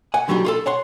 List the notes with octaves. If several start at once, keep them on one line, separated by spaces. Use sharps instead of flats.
F#5 G#5
D3 F#3 G3 C4 D#4
F4 G#4 A4
C#5 F#5 C6